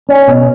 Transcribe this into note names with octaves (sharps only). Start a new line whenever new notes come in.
C#4
B2